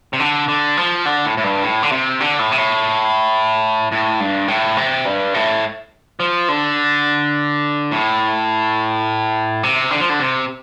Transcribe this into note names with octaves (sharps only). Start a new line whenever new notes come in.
C3
D3
D3
F3
D3
A2
A2
G2
A2
D3
C3
D3
A2
C3
A2
A2
G2
A2
C3
G2
A2
F3
D3
A2
C3
D3
F3
D3
C3